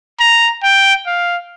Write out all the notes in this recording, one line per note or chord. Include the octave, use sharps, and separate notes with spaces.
A#5
G5
F5